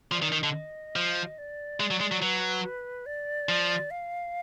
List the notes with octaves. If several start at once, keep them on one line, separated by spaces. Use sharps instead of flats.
F3 D5
D#3
D#3 D#5
D3
F3
D5
G#3
F#3
G#3
F#3
F#3 B4
D5
F3
F5